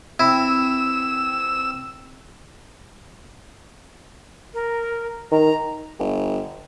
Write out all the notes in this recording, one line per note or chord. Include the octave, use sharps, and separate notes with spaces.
C4 E4 E6
A#4
D#3 A#5
G1